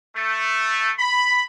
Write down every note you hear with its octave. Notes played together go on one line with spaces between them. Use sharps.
A3
B5